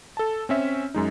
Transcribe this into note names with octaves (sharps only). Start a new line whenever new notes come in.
A4 A5
C4 C#4 E5
F#2 G#3 D#4